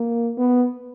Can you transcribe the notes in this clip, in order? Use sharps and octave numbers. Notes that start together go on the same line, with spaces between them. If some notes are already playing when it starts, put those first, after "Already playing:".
Already playing: A#3
B3